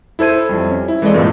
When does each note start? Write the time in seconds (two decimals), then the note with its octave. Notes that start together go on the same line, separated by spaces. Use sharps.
0.19 E4 A4 C5 G#6 D#7
0.49 F2 G3
0.69 C#4
0.88 E4
1.02 E3 G#3 C4 A4 D5 D#5
1.14 G2 A#2